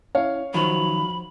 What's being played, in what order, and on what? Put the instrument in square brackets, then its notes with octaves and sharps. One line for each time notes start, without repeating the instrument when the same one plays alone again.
[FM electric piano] C#4 E4 [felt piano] C#5 F5
[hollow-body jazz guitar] D#3 F#3 [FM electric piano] F3 F#4 C5 [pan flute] B5